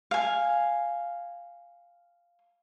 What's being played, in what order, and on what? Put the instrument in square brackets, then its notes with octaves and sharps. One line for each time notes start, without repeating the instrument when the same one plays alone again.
[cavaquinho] F5 G#5